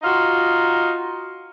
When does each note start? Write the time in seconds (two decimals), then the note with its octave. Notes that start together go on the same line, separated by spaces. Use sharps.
0.03 D#4 F4 F#4